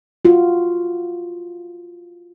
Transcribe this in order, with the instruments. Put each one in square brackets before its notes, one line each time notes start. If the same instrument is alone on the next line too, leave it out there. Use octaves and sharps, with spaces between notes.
[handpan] F4 F#4